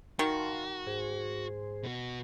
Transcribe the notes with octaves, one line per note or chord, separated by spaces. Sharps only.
D#3 F#4 F5 A5 C6
G#2 G#4 C5
B2 F#4